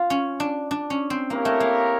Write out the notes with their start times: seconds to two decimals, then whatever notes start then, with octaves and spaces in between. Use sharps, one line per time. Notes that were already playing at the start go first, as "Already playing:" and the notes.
Already playing: F4
0.10 C#4
0.40 D4
0.71 D4
0.90 C#4
1.10 C4
1.30 A#3 E4 G4 A#4 C#5
1.45 A3
1.60 A#3